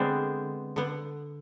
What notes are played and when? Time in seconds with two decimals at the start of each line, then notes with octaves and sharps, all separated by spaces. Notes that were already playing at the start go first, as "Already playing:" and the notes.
Already playing: D3 G#3 B3 C4 D4 C5 D5
0.76 D3 B3